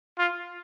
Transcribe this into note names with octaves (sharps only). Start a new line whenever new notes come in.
F4